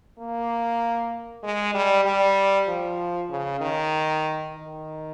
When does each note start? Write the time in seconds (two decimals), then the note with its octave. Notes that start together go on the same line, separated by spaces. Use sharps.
0.19 A#3
1.43 G#3
1.74 G3
2.05 G3
2.68 F3
3.29 C#3
3.60 D#3
4.54 D#3